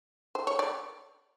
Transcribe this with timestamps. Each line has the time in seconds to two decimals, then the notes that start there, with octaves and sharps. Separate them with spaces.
0.35 C5
0.47 C#5
0.59 D5